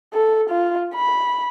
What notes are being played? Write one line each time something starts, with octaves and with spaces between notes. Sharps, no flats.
A4
F4
B5